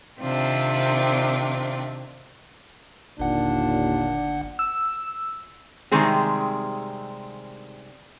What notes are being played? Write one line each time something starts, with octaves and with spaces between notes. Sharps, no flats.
C3 D#3 C4 D4 F4
G1 D#2 A#2 D4 F#5
E6
C3 D#3 G3 G#3 C4 G#4